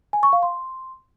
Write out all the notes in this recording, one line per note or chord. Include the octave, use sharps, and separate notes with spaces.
G#5
C#6
F5
C6